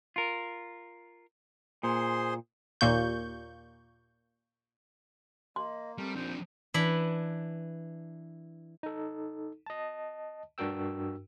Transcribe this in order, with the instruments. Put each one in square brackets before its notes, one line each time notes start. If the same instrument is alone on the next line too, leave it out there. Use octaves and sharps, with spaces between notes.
[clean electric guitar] F4 A#4
[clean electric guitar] A#2 [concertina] G#4 C5 C6
[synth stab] D#2 A#2 A#3 C#6 G6
[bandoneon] A#3 [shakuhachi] D#5 [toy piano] C6
[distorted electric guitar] G3 [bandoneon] A3 A#4 [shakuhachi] C4
[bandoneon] D#2 C5 [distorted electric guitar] F3 D4
[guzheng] E3 D4 B5
[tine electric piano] D#4 A4
D#5 A5
G2 D4 F#4 A#4 G5 E6